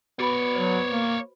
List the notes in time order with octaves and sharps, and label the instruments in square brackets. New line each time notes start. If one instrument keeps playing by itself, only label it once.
[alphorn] B3 [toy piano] F#4 B5 [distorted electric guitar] C#5 D5
[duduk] F#3 [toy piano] B4 C5
[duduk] A#3